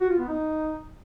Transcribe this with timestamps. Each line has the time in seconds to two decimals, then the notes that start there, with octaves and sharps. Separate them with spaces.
0.01 F#4
0.10 F4
0.19 B3
0.28 D#4